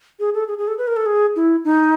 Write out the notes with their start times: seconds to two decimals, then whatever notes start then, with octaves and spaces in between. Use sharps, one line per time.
0.20 G#4
0.34 A4
0.48 G#4
0.58 G#4
0.68 A4
0.78 B4
0.87 A#4
0.96 A4
1.06 G#4
1.36 E4
1.64 D#4